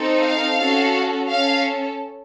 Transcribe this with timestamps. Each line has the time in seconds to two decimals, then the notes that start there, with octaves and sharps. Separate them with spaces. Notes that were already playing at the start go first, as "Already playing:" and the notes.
Already playing: C4 D#4 A4
0.23 F5
0.58 C#4 F#4 A4
1.29 C#4 A4 F5